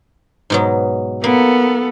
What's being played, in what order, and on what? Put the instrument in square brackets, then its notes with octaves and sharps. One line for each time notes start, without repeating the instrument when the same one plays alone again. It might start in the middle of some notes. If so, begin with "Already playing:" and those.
[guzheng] G#2 B2 F#3
[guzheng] A#3 [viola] B3 A4